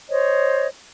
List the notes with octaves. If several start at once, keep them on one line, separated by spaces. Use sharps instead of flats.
C5 C#5 D#5